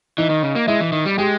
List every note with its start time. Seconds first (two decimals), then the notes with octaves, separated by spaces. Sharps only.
0.18 E3 D#4
0.30 D#3
0.43 C#3
0.55 A#3
0.67 G#3 E4
0.80 E3
0.92 D#3
1.05 G3
1.18 G#3 G4